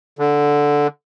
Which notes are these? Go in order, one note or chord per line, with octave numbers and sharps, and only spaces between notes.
D3